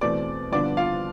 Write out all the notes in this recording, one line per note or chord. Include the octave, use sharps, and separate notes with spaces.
E2 B2 A3 C4 D5 D6
G2 D3 F3 B3 D4 D5 D6
F4 F5